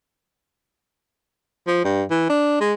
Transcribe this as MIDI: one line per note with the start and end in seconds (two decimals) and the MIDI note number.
1.67 1.82 53
1.84 2.03 43
2.10 2.28 52
2.29 2.60 62
2.60 2.74 56